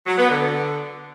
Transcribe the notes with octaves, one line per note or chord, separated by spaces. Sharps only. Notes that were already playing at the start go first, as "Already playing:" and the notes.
F#3
B3
D3